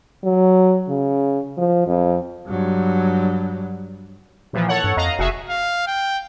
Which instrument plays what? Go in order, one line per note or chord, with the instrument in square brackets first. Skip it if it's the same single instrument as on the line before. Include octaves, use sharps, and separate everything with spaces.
[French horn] F#3
C#3
F3
F2
[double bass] G2 F#3
[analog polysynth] A#2 E3 F3
A4 C#5 F#5
[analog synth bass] G2
[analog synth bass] F2 [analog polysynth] D#5 F5 A#5
[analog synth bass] F1 [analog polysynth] F#4 G#4 E5
[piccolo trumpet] F5
G5